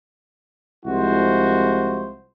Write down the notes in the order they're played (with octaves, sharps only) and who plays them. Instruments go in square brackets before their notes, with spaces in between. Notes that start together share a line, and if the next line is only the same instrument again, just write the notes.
[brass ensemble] C2 F3 G#3 E4 F#4 C5